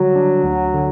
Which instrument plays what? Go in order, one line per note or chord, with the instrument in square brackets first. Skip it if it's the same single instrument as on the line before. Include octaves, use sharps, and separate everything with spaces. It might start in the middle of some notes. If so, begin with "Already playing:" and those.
Already playing: [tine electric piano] D3 G3 F#4 [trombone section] F#3
[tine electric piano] D4
D2
D3